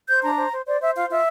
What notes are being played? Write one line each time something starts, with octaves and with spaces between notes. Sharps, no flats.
C5 G6
D4 A#5
C5
C5
C5 D5
C5 E5
F4 F5
F4 E5